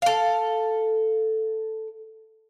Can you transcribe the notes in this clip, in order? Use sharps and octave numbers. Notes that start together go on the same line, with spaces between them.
A4 F5